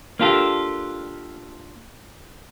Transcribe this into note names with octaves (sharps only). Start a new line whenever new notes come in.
A#3 D4 F4 G4 A4